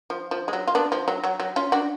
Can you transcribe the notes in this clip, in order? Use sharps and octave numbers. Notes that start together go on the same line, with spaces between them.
F3
F3
G#3
F#3
F4
B3 D4
F3
F#3
F#3
F#3
C#4 F4
D4 F#4